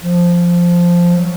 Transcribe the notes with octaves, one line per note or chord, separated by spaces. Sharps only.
F3
F#3